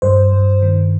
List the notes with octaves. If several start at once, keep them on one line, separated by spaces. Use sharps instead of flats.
G2 C5
G2
D#3